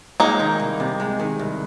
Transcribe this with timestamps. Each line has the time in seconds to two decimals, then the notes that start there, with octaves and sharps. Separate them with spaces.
0.20 G#3 A#3 D#4
0.40 D#3
0.60 C2
0.80 C3
1.00 G#3
1.20 D#3
1.39 C2